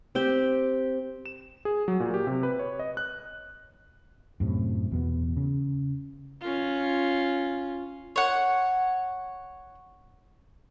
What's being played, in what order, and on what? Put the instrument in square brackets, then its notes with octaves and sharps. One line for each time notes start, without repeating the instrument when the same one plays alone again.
[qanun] C4 G4 G5
[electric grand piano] E7
G#4
F#3
A#2
G4
C3
B4
C#5
D#5
F#6
[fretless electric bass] F#2 A2 C3
E2 B2 B3
C#3
[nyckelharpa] C#4 F4
[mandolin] C#5 F#5